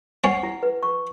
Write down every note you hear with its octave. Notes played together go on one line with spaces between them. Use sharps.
C#4 C#5 F#5
E4
B4
C#6